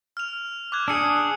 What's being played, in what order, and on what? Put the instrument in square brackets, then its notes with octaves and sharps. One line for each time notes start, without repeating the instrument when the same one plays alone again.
[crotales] F6 F7
D6 F#6 G#6
[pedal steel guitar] D4 G#4 [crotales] E6 C#7